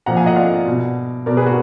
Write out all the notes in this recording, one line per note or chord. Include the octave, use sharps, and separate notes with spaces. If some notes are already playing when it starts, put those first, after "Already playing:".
A#2 F3 F#5 A#5
F5 G#5
D#5 F#5
D5 F5
B2
B2 A#4 D5
G#4 B4
F#4